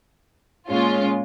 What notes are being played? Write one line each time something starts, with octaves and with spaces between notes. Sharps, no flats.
A#2 G#3 C#4 F4